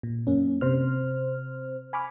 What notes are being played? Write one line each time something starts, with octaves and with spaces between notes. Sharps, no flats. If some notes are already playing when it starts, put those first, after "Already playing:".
A#2
F#2 A#3 C#4
C3 C5 F6
G#5 B5 C#6 D6 F6